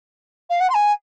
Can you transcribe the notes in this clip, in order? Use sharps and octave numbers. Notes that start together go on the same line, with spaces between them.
F5
F#5
C6
G#5